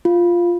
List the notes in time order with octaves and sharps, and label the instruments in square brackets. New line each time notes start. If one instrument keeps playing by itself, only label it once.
[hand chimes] F4